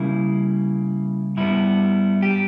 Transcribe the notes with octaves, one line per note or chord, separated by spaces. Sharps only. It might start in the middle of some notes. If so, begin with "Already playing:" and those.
Already playing: C#3 G3 A#3 E4
G2 G3 B3 E4
G4